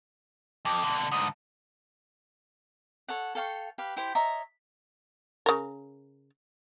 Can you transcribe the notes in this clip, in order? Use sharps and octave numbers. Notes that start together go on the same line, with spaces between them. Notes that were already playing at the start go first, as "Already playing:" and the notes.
F2 D6
B2 D3
G#2 D3 D#6
A4 C#5 F#5
A4 F5 G5 C#6
G4 B4 F5
E4 G4 C5
C#5 D#5 E5 A#5
C#3 A#4